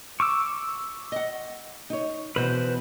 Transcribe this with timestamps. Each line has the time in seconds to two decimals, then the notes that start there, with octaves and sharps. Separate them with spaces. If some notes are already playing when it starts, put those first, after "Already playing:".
0.20 C#6 D6 E6
1.12 D#5 F#5
1.90 D#4 C#5
2.36 B2 E3 B3 B4 C5